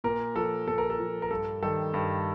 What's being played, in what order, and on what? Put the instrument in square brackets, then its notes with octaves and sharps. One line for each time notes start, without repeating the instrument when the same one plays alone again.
[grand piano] A#2 A#4
F3 A4
A#2 A4
A#4
A4
F3
A#4
G2 A4
D#3 G3 A4
G2